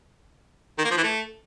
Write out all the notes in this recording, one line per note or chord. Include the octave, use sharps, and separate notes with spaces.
D#3
A#3
F3
E3
A3